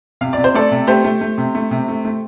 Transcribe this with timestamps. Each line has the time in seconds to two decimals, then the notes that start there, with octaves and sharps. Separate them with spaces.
0.21 C3 F5
0.33 C3 D5
0.44 C5
0.54 A3 A4 D5
0.71 C3
0.87 A3 G4 C5
1.04 A3
1.21 A3
1.38 C3
1.55 A3
1.71 C3
1.88 A3
2.05 A3